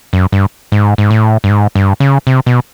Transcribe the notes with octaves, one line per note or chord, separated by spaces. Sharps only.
F#2
G2
G#2
G#2
A2
G2
G#2
G2
C#3
C3
B2